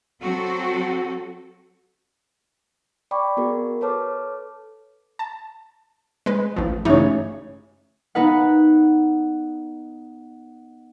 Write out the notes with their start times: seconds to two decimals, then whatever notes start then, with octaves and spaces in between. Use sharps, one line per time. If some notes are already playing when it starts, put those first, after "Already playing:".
0.22 F#3 C4 F#4 A4
3.11 D5 G5 B5 C#6 D6
3.37 B3 F#4 G#4 A#4
3.81 A4 B4 C#5 A5 D6 F6
5.19 A5
6.26 G#3 B4
6.56 A1 F3
6.85 A1 C#3 D#4 C#5
8.15 B3 D#4 B4 F#5